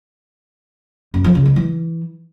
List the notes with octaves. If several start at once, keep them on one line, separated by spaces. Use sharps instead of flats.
F#2
F3
C#3
G#3
E3